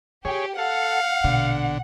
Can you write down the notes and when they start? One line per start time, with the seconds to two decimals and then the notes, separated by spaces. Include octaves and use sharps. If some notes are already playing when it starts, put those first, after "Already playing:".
0.25 F4 G4 G#4 C#5
0.59 A4 F5 F#5
1.24 A#1 B2 D3